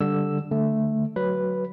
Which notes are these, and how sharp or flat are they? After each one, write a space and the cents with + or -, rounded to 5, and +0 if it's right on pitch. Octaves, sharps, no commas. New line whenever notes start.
D3 +0 G3 +0 E6 +0
D3 +0 A3 +0
F#3 +10 B4 +0